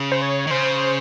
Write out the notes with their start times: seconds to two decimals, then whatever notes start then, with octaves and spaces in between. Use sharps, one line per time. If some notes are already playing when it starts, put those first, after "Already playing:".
Already playing: C#3
0.12 C5
0.22 C#5
0.47 D#3
0.51 C#3 C5